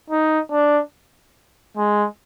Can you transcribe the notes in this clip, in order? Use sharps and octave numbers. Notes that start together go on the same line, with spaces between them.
D#4
D4
G#3